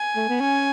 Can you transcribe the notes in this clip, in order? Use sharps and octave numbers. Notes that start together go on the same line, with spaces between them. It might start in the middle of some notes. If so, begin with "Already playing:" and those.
Already playing: G#5
A3
B3
C#4 G#5